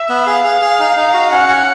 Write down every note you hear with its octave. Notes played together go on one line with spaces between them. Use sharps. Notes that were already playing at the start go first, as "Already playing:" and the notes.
Already playing: E5
B3
G#4 F5
G#4
G#4
D#4
D#4
F#4
C#4 F#5
C#4